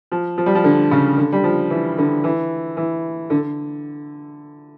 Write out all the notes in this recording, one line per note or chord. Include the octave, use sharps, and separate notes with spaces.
F3
F3
G3
F3
D3
C#3
D3
G3
F3
E3
D3
E3
E3
D3